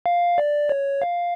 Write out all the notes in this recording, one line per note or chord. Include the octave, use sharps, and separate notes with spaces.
F5
D5
C#5
F5